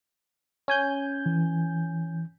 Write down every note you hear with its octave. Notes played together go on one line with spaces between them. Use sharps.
C#4 G#5 G6
E3